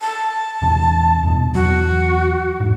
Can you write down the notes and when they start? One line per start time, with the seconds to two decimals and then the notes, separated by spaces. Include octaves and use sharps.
0.01 A5
0.62 E2 C3
1.23 E2 G2 B2
1.55 E2 F#3 F#4
2.60 E1 G#2